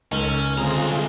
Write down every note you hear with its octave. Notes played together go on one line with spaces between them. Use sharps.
C#2 C#4 D#4 A4 A#4
C2 D3 G#3 C4 F4 G#4 A#5